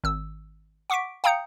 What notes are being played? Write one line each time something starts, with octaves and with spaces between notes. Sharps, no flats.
G#1 E6
F#5 C#6 D6 B6 D7
F5 G5 A#5 D#6 G6 C#7